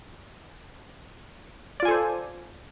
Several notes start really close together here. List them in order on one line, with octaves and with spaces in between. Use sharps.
D5 F4 G#5 A4 C5